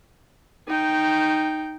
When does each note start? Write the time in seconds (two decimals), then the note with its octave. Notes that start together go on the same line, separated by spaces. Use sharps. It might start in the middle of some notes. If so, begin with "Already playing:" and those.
0.67 D#4 G5